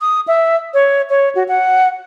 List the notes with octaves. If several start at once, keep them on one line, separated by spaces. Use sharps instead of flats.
D#6
E5
C#5
C#5
F#4
F#5